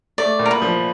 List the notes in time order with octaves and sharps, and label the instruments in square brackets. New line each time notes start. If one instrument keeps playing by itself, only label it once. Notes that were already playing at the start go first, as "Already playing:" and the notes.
[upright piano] A3 [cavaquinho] D5
[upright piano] A#2
[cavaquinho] A#4
B4
[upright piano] F3